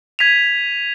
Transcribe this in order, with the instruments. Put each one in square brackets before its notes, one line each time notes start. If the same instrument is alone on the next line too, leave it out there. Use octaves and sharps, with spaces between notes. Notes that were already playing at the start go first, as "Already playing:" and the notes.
[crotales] G#6 B6 D#7 F7